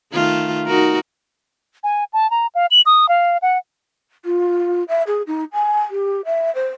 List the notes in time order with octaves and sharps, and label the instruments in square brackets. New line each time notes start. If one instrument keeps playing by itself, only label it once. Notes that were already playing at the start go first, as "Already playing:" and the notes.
[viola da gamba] D#3 A3 F4
D#4 F#4 A#4
[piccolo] G#5
A5
A#5
F5
F#7
D#6
F5
F#5
[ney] F4
E5
G#4
D#4
G#5
G4
E5
C5